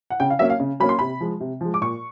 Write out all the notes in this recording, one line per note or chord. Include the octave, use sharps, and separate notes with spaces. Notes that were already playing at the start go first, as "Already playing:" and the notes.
F#5
C#3 G5
F5
F#3 A#3 C#4 E5
F5
C#3
F#3 A#3 C#4 B5
C6
C3 B5
F3 G#3
C3
F3 G#3
D6
A#2 C#6